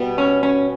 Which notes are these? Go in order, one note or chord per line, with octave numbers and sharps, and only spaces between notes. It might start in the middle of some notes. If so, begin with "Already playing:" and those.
Already playing: B2 G3 B3
C#4
C#4